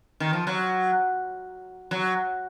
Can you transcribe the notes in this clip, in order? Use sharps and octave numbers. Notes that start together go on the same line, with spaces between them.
D#3
F3
F#3
F#3